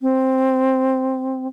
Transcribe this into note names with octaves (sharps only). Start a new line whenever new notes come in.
C4